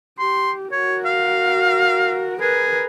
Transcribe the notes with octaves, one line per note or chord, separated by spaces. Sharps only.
G4 C6
F#4 A#4 C#5
F5
G#4 A#4 B4